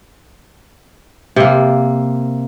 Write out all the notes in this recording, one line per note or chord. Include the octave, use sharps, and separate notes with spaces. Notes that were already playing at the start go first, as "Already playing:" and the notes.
C3 A#3